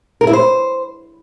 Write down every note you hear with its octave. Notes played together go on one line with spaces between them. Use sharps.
A#4
E4
C5